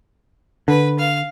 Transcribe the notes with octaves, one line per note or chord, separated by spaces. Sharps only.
D3 B4
F5